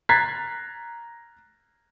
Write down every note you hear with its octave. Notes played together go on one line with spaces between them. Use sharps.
A#5 F#6 G#6 A6 B6 C7